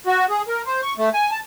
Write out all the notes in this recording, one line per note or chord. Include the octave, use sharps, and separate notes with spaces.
F#4
G#4
A#4
C5
C#6
A3
G#5
A5